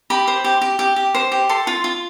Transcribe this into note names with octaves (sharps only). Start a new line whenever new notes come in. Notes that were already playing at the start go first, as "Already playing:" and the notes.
G4 B5
C5
G4
G4
G4
G4
C5
G4
A4 C6
F4
F4